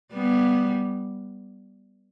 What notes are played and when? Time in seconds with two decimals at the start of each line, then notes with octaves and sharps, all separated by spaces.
0.13 G3 B3